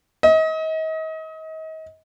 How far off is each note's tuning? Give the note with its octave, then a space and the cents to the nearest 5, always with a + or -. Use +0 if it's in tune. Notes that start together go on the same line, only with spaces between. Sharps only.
D#5 +35